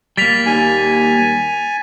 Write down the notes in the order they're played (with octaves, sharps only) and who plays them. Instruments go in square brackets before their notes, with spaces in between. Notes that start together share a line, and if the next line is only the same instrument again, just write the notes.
[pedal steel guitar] G3 A#3 [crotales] A6 B6 F7
[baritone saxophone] D#2 [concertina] G#5